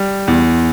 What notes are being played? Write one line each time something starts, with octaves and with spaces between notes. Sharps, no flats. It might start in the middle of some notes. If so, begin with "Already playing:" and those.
Already playing: G3
E2